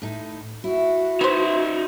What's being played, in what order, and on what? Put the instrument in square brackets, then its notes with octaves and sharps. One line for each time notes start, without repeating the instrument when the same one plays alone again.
[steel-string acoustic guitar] A2 D#4
[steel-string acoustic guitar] E4 [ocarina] F#4
[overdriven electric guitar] D#4 E5 [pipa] B4 C5